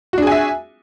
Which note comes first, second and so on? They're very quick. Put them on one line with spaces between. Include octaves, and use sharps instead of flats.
F#4 D4 G#4 G#5 E5